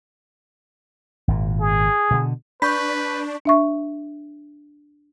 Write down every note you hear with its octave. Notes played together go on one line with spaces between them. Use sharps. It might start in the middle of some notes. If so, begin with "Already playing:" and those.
G#1 A#2
G#4
B2 D3
D4 B4 B5 C#6 G6 B6
D4 E5 C#6